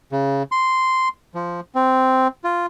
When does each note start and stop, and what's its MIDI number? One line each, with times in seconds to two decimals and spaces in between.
0.12 0.43 49
0.52 1.08 84
1.35 1.60 53
1.75 2.28 60
2.44 2.66 65